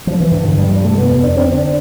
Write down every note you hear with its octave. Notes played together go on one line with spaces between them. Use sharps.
F3
E3
G2 D3
E3
G2 G3
G3
C3 A3
B3
F2
D4
D3 C4
D4